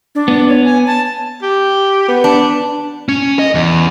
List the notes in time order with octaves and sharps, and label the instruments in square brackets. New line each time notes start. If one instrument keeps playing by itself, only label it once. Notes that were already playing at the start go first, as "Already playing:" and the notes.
[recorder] D4
[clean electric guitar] B3
[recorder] C#5
G#5
A5
[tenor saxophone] G4
B3
[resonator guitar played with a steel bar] D4
[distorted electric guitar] C#4
D#5
E2